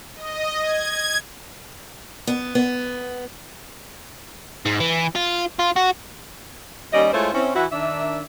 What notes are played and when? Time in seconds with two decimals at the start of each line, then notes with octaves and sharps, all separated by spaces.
0.15 D#5
0.61 G#6
2.27 B3
2.55 B3
4.65 G#2
4.80 E3
5.15 F4
5.59 F4
5.76 F#4
6.93 D#2 G3 C#4 D5 D#5
7.13 G#3 A3 E4 F4 C5 C#5
7.34 C4 C#4 E4
7.55 E3 E4 F#4
7.72 D#3 D4 E5